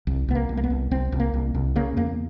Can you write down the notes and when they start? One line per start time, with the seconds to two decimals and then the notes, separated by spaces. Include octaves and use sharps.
0.07 C2
0.28 C2 B3
0.35 A#3
0.49 C2
0.57 A#3
0.64 B3
0.70 C2
0.91 C2 C4
1.12 C2
1.20 A#3
1.34 C2
1.54 C2
1.76 C#3 A#3
1.97 E2 A#3